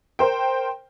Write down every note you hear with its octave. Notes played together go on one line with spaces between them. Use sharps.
A#4 C5 G5